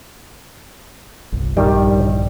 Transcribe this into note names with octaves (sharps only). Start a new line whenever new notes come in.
G1 C2
A#1 G2 D#3 G3